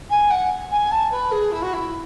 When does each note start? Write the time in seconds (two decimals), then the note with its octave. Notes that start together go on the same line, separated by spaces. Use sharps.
0.10 G#5
0.30 F#5
0.71 G#5
0.91 A5
1.11 B4
1.31 G#4
1.52 E4
1.62 F#4
1.73 E4